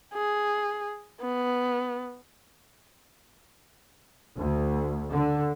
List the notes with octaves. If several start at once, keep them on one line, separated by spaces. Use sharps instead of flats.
G#4
B3
D2
D3